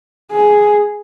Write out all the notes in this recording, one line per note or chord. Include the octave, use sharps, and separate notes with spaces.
G#4